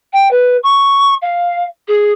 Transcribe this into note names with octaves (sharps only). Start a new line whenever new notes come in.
G5
B4
C#6
F5
G#4